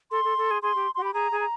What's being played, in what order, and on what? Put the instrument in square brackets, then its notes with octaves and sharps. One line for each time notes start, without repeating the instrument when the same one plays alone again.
[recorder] A4 [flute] C6
[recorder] A4
A4
G#4
[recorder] G#4 [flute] C6
[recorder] G4
[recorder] F#4 [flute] C6
[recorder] G4 [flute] B5
[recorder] G#4 [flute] A#5
[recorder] G#4
[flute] A#5